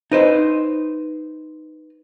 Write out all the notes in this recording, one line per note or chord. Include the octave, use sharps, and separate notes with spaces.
D#4 B4 C5